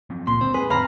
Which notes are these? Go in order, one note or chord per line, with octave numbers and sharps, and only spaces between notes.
F3 F#3 C4
C#2 A#2 C6
D3 G#3 C4
G#4 B4
F2 A2 C4 F5 G#5 A#5 B5